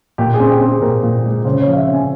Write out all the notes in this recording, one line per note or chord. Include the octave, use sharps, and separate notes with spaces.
A#2 G4
G#4
C4
G4
C4
G#4
A#2 A#4
A#2
G#3
C#3 C5
F3 C#5
F5
E5
C4
G#5